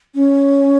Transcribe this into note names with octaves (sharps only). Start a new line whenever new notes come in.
C#4